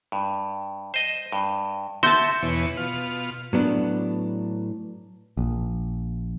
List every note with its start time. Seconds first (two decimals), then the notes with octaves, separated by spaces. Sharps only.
0.12 G2
0.94 C5 D#5
1.32 G2
2.03 F#4 E5 A5 C6 G6
2.43 E2 B2 E3 C#5
2.77 B2 F4 F6
3.53 A2 F#3 B3 D4
5.37 A#1